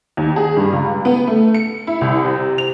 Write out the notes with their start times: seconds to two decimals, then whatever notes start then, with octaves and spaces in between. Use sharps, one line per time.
0.17 D#2
0.36 G#4
0.57 G2
0.73 C#2
1.05 B3
1.27 A3
1.54 C#7
1.87 E4
2.01 C2
2.25 C3
2.58 F7